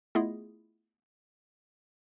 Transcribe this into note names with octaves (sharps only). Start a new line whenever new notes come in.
A3 B3 E4 F4 G#4 D#5